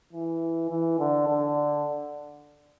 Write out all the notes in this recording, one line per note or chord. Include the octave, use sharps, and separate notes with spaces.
E3
E3
D3
D3